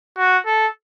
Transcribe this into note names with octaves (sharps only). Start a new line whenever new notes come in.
F#4
A4